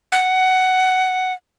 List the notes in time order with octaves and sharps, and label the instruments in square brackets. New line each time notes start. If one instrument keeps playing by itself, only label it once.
[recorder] F#5